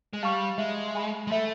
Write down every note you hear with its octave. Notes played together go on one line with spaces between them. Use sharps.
G#3
G3 F5 A5 C#6 F6
G#3 E5
G#5 B5
G#3
A3 E5